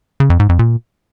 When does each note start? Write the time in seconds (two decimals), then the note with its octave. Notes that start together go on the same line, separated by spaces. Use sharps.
0.20 C#3
0.30 F2
0.40 G#2
0.49 F2
0.59 A#2